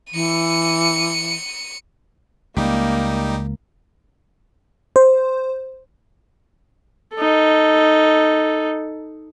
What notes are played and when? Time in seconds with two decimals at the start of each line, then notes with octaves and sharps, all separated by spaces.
0.12 E3 C#7 D#7
2.57 C#2 G3 A#3 D#4 G4
4.96 C5
7.15 D#4 A4